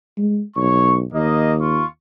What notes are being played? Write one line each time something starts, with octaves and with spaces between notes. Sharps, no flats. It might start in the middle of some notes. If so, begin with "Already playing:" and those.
G#3
B1 C#5 C#6
D#2 A#3 D#5
F4 C#6